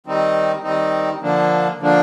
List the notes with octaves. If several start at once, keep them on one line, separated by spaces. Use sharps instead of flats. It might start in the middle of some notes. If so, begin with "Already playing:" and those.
D#3 G3 C4 D#4
D#3 G3 C4 D#4
D3 F3 A#3 D4
D3 F3 A#3 D4